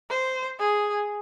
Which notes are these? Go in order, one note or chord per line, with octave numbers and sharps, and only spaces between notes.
C5
G#4